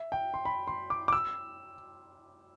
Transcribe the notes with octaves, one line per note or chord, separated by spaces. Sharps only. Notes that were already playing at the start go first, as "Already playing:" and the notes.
Already playing: E5
G5
C6
B5
C6
D6
D6
E6